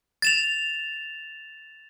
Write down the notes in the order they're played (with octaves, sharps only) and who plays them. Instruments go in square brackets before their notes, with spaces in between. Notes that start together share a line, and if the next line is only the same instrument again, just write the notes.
[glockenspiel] A6 E7 F7